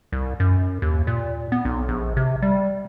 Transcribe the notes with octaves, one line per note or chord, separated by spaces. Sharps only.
C2
F#2
D#2
A#2
B3
B1
A#1
C3
G3